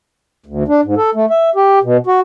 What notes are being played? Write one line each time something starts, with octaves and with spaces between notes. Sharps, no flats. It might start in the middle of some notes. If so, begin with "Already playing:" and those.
D2
D4
G#2
A4
A3
E5
G4
B2
F#4